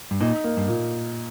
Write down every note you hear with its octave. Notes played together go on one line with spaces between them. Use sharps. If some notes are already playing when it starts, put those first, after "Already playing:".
G2
A#2 D#4
A#3
G2
A#2